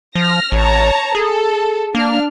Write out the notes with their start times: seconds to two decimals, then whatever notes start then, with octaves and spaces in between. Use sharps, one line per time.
0.15 F3 F6 A#6
0.52 A1 C#5 A5 A#5
1.15 G#4 A4
1.95 A#3 D4 F6